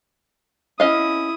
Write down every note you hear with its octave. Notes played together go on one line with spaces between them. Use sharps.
C#4 E4 D#5 F5 D#6